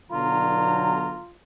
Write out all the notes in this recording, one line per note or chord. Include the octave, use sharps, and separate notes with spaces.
B1 D3 F4 A#5